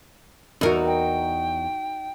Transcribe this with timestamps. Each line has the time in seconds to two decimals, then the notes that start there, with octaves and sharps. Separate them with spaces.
0.61 E2 D#4 F#4 A#4
0.86 G5